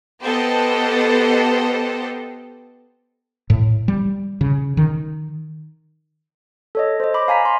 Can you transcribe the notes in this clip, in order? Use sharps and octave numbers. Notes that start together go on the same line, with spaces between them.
B3 G4 A4 C5 D#5
A2
G3
C#3
D#3
A4 C#5 D#5
C5 D#5
B5 D6
F5 G#5 A#5 B6
C6